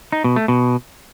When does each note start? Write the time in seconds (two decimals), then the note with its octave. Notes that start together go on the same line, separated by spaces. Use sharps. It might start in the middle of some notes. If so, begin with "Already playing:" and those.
0.12 D#4
0.24 B2
0.36 A3
0.48 B2